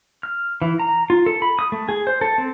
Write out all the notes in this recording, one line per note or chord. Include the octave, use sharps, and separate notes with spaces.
F6
E3
A#5
F4
A4
B5
D#6
A3
G#4
C5
A4
C4